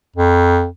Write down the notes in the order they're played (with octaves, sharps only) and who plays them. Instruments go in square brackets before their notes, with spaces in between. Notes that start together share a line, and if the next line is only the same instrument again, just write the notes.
[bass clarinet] F2